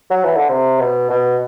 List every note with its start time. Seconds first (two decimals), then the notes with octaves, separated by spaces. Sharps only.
0.10 F#3
0.23 E3
0.36 D3
0.49 C3
0.79 B2
1.10 B2